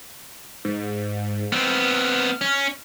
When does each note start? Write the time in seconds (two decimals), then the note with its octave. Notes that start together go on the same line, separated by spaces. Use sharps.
0.65 G#2
1.52 B3 C4 F6
2.41 C#4